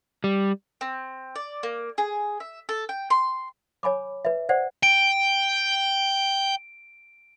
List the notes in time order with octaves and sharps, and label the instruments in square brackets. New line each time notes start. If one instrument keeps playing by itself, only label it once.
[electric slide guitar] G3
[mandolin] C4
D5
A#3
G#4
E5
A4
G5
C6
[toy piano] C#5 G#5 B5 D6
B4 E5
C5 D5 F#5
[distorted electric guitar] G5 [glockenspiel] D7